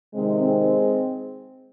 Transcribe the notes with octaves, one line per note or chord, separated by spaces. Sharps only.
C3 D#3 G#3 C4
G#3 C4